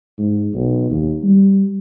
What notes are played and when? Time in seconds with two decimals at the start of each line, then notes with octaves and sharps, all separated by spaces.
0.18 G#2
0.55 B1
0.90 D#2
1.24 G3